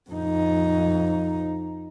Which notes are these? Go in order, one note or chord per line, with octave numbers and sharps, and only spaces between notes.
F2 D#4